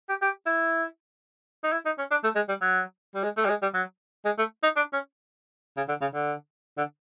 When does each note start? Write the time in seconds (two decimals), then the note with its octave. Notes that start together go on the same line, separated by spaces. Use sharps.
0.09 G4
0.22 G4
0.46 E4
1.64 D#4
1.72 E4
1.85 D#4
1.98 C#4
2.11 D4
2.24 A3
2.35 G#3
2.48 G3
2.62 F#3
3.15 G3
3.24 G#3
3.37 A3
3.45 G3
3.49 G#3
3.62 G3
3.74 F#3
4.25 G#3
4.38 A3
4.63 D#4
4.76 D4
4.93 C#4
5.77 C#3
5.89 D3
6.01 C#3
6.14 D3
6.78 D3